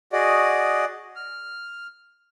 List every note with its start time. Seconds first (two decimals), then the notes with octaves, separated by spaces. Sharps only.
0.13 F#4 G#4 D5 D#5
1.16 F6